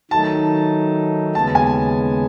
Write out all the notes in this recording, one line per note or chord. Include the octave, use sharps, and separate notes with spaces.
D#3 F#3 A3 D#4 A5
D#2 C#3 G#3 B3 A5
G#5